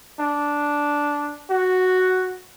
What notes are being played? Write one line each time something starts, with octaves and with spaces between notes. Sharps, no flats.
D4
F#4